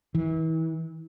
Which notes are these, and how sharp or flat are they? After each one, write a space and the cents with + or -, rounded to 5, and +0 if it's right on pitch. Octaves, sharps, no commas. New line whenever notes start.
E3 -35